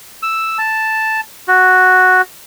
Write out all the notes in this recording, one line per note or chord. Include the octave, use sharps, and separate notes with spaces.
E6
A5
F#4